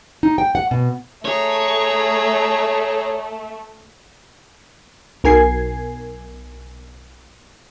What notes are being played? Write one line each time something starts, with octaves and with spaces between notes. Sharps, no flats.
D#4
G5
F#5
B2
A3 G#4 C#5 A#5
B1 A#4 G#5 G#6 C7